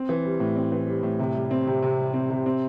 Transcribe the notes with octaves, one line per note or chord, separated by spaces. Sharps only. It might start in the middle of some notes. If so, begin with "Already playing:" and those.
Already playing: C4
E3
G3
A2
C4
E3
G3
A2
C3
G3
C4
C3
C3
G3
C4
C3
C4